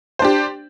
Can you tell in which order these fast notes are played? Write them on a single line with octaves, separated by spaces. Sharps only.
C5 D4 G4